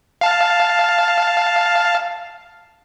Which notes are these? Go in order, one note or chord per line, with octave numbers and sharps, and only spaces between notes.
F5 A5